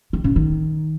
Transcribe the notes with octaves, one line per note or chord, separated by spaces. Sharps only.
D#3
C#3
D#3